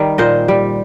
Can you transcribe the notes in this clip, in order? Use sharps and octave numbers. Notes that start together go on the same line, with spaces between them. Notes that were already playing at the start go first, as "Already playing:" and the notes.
Already playing: D#3 G3
A#2 C5 D#5
G3